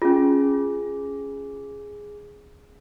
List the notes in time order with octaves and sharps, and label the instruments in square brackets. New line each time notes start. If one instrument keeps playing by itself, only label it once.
[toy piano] C#4 F4 [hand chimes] G#4